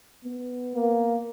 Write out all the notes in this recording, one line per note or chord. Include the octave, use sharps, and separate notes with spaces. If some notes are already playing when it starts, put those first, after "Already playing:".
B3
A#3